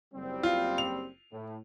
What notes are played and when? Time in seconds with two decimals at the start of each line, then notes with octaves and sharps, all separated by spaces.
0.14 F#1 G3 C4
0.43 F4
0.78 F7
1.32 A2